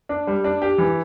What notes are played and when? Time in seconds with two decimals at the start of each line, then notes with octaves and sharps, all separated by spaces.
0.09 D4
0.27 G3
0.44 D4
0.62 G4
0.78 E3